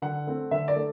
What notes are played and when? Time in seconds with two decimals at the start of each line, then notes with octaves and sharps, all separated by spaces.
0.02 D3 F#5
0.27 A3 C4
0.51 D3 E5
0.68 D5
0.76 A3